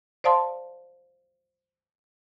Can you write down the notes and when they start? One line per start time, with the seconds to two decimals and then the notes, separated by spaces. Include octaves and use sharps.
0.24 C5 D5 F5 A5 C6